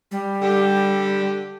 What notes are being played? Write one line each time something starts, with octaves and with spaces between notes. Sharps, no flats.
G3
D3 G4